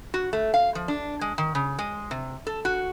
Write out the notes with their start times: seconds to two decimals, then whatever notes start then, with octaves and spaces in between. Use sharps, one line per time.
0.14 F#4
0.33 A3
0.54 F5
0.75 F3
0.88 D4
1.21 G#3
1.38 D#3
1.55 C#3
1.79 G#3
2.11 C3
2.47 A4
2.65 F#4